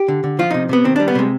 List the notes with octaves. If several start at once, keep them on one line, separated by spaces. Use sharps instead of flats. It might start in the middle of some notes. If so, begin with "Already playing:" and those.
Already playing: G4
D3
D3
F3 F4
C3 D#4
C3 B3
D#3 C4
G3 D4
B3
C3 G#3